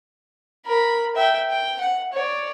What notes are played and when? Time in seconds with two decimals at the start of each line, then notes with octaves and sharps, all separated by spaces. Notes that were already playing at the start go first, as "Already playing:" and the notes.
0.66 A#4 B5
1.16 E5 G5
1.50 G5
1.81 F#5
2.13 C#5 D5